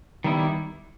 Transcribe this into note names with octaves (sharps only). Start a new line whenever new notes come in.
D#3 G3 B3 E4